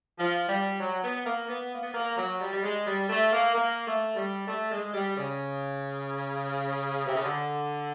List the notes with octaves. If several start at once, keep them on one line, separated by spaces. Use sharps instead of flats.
F3
G3
F#3
B3
A#3
B3
A#3
B3
A#3
F#3
G3
G3
G#3
G3
A3
A#3
A#3
A3
G3
A3
G#3
G3
C#3
C3
C#3
D3